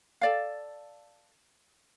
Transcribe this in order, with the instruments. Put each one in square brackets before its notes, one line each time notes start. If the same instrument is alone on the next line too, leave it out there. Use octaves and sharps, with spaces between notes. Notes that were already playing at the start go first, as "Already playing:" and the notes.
[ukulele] A4 D5 F5